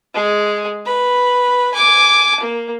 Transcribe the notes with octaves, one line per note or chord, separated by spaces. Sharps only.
G#3 G#4
B4 B5
G#5 D6
A#3